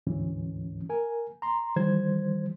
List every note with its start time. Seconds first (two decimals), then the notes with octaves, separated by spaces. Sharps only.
0.07 D2 G#2 E3 C#4
0.89 A#4 G#5
1.42 A#5 C6
1.76 D#3 E3 G3 C5 G#6